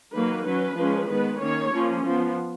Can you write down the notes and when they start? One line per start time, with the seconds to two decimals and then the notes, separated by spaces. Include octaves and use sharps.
0.13 D#3 F#3 A#3 B4
0.45 F#3 C#4 B4
0.76 F3 G#3 C#4
1.09 D#3 G#3 B3 B4
1.40 D#3 A#3 C#4 C#5
1.72 F3 A#3 C#4
2.04 F3 B3